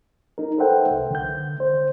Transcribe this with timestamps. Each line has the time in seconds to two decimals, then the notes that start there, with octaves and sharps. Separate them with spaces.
0.38 D#4 A#4
0.58 A4 B4 C5 E5 F#5 G5
0.91 C2
1.11 D3 G6
1.60 C5